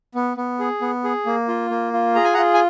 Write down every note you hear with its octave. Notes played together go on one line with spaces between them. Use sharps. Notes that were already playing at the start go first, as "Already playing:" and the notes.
B3
B3
G#4
B3
G#4
A#3
F4
A#3
F4
G#4 A#5
G#5
F#5 A#5
F4
G#5